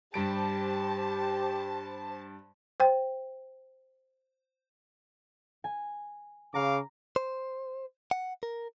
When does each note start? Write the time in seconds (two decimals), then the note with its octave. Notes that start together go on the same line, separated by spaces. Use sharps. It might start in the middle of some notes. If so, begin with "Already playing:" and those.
0.14 G2 G3 G4 C5 A5 D7
2.80 C5 G5
5.64 G#5
6.54 C#3 F5 A#5 D6
7.16 C5
8.11 F#5
8.43 A#4